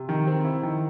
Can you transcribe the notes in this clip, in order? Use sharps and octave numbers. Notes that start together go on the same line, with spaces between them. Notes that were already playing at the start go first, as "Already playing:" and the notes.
Already playing: C3
D#3
C4
E4
D#3